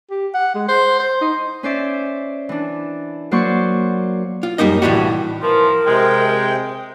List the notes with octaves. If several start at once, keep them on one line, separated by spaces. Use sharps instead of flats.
G4
F#5
G#3
C5
C5
D#4
C#4 C5 D5 E5
E3 D4
F#3 A#3 C5 D5 C6 C#6
F4
F#2 B2 G3 A#3 D#4 D#5
C2 A2 E3 G3 D4 F#4
E3 F3 A#4
C3 G#3 G5